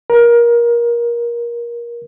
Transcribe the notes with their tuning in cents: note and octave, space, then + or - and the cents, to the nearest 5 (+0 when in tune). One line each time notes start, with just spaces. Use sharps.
A#4 +20